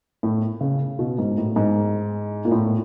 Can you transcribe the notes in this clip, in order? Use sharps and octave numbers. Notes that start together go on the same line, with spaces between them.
A2
C#3
B2
G#2
A2
G#2
A#2
A2